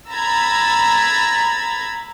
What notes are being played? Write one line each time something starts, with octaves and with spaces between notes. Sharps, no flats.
A#5 B5 E6 G#6 A6 B6